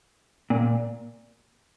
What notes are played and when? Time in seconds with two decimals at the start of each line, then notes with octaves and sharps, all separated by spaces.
0.50 A#2